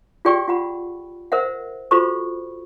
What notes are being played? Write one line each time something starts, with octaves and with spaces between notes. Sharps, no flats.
F4 G4 G#4 D5 G5 C#6
F4 F#5 B5
A#4 C5 E5 F#5
F4 F#4 A4 C5 B5 C#6